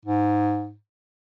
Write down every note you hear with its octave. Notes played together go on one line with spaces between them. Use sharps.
G#2